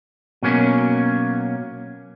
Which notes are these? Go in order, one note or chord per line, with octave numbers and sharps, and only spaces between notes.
B2 F#3 A#3 C#4